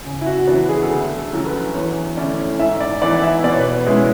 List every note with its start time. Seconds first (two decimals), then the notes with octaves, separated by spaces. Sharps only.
0.05 C#3
0.21 E4
0.26 F#4
0.47 E3 B3 D4 F#4
0.69 G#4
0.83 A4
0.90 D2 G#4
1.18 A4
1.32 D3 F#3 C#4 F#4
1.46 B4
1.75 E2 C#5
2.17 D3 A3 C#4 E4 D5
2.59 G#2 E5
2.80 D5
3.02 E3 B3 E4 D5
3.23 E5
3.44 B2 D5
3.52 C#5
3.60 B4
3.67 C#5
3.86 G#3 C#4 E4 G#4 B4